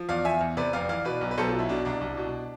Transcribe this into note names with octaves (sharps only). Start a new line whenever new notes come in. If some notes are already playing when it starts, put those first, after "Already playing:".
Already playing: F3
E2 D5 F5
E2 E5 G#5
E2
C3 B4 D5
F1 D5 F5
E3 D5 F5
B2 B4 D5
B1
B4
B1 A4 C5
F4 A4
B2
E4
B2 D4
C2 D4
C2
B2